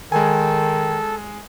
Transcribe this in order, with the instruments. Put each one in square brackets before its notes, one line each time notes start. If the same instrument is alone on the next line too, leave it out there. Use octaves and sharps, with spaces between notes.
[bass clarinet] D#3 [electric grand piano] G#3 G#5 [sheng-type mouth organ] A4